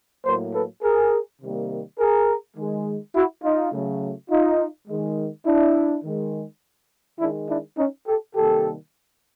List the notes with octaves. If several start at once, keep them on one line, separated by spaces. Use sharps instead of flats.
A2 F#3 A#3 A#4 C5
A4 B4
G#4 A#4
C3 D#3 G3 A#3
G#4 A#4
D#3 G#3
E4 F#4
D#4 F4
C#3 F#3 A3
D#4 F4
D#3 G#3
D4 E4
D#3 G#3
D#3 G#3 D4 E4
D4 E4
C#4 D#4
G4 A4
C3 D#3 G3 A#3 G4 A4